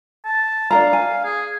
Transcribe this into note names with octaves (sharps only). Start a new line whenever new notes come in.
A5
D4 A#4 F5 A#5
G#5
G#4